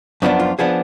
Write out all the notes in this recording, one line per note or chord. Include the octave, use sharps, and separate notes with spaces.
F#2 F3 B3 D4 D#4
F4
F3 B3 D4 G#4